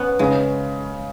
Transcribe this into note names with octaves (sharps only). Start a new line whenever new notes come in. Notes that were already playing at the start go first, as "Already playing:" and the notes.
Already playing: B3 C#4
C#3 G#3